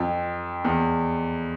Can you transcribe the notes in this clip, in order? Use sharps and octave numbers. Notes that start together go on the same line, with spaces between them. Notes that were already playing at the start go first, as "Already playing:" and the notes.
Already playing: F2
E2